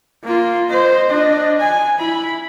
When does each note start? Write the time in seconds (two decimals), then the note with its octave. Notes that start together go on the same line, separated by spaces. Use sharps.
0.24 A#3 F4
0.69 C5 D#5
1.09 D4 D#5
1.60 G#5
1.98 E4 B5